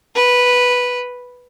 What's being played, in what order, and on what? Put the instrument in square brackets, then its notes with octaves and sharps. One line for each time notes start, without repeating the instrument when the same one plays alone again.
[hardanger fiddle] B4